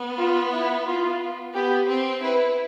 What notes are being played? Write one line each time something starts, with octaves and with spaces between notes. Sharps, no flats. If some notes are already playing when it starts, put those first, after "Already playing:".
Already playing: B3
F4
E4
F4
B3 G4
C4
E4 B4